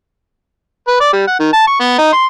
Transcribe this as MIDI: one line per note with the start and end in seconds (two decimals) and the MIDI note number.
0.88 0.99 71
1.00 1.11 74
1.13 1.24 55
1.27 1.36 78
1.39 1.49 51
1.53 1.63 81
1.67 1.76 85
1.80 1.95 59
1.98 2.12 63
2.13 2.25 84